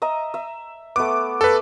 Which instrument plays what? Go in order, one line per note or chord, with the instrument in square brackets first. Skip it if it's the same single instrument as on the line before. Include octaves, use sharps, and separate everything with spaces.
[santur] D#5 E5 A#5
E5
[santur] A3 B3 [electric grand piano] D6
[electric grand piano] A4 B4